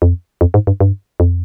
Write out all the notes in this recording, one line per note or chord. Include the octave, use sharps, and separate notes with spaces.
F2
F2
G#2
G2
G2
F2